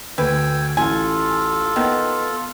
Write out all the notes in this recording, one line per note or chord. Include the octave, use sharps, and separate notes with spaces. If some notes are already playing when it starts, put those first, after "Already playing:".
D2 B4 G5 G#5 E6
A1 F4 A4 G#5
D#3 B3